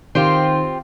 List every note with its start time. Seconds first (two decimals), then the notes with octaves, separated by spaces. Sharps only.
0.15 D#3 C4 F4 G4